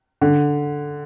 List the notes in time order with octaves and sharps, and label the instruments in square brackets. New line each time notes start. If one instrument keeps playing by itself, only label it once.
[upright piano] D3